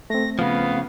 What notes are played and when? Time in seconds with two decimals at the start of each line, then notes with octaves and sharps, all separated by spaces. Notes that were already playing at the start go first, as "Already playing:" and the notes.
0.10 A3 C4 A#6
0.39 C#3 F3 B3 F5